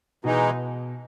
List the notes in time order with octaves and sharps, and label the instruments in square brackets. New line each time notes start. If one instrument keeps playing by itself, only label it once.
[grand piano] B2 [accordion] E3 G#3 D#4